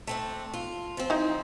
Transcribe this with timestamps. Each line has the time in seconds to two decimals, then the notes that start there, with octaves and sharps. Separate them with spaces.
0.07 A3 C4 D4
0.54 F4
0.97 F3 C4
1.10 D#4 E4